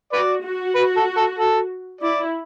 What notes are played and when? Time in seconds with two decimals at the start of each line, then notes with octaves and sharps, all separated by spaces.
0.13 F#4 B4 D5
0.44 F#4
0.76 B4
0.97 A4
1.17 A4
1.39 A4
2.01 E4 D5